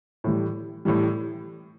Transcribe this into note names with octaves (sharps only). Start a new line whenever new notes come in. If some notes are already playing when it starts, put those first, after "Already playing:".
A2 E3 G3
A2 E3 G3